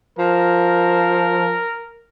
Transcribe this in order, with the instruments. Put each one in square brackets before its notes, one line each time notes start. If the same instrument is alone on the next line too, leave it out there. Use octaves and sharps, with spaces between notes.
[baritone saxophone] F3 [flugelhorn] A#4